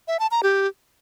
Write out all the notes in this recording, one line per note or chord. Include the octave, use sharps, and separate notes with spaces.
E5
A5
A#5
G4